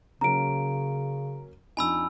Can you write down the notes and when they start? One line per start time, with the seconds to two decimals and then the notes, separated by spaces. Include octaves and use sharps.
0.21 C#3 F#3 A#3 C#4 A#5 D7
1.77 F2 D4 D#4 G#5 B5 E6